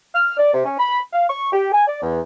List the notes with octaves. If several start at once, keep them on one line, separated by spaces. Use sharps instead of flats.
F6
D5
C3
C#4
B5
F5
C#6
G4
G#5
D5
E2